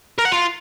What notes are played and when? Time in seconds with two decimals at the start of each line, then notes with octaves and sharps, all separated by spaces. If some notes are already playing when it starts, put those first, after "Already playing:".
0.18 A#4
0.25 F#5
0.32 F4